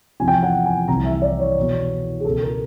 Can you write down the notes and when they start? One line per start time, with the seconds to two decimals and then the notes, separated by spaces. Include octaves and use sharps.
0.20 E2 C3 F3 G#5
0.28 G5
0.35 G#5
0.43 F#5
0.66 G#5
0.88 C2 C3 E3 A#5
1.05 E5
1.22 D5
1.40 C#5
1.57 E2 B2
2.20 G#4
2.25 C#2 B2 A4
2.42 A#4